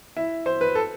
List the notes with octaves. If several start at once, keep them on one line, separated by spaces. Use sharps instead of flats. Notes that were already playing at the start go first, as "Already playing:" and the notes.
E4
C5
B4
A4